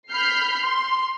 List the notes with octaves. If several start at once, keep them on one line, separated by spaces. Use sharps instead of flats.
B5 F6 G6 C7
C6